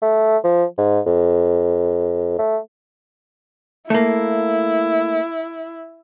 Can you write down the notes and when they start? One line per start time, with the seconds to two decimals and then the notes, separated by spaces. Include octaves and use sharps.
0.02 A3
0.44 F3
0.78 G#2
1.06 F2
2.39 A3
3.90 A3 A#3 E4